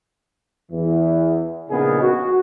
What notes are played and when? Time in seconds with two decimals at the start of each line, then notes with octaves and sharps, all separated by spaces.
0.71 E2 E3
1.70 A#1 C#3 B3 D#4 G#4 A#4
2.01 F#4